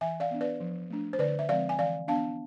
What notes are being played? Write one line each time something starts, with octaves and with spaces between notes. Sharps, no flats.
E3 E5 G#5
D5 F5
B3 D4
B4 D5
F3
A3 D4
C5
D3 B4 D5
E5
F3 G#3 C4 D5 F5
G#5
E3 D5 F5
B3 D4 F5 A5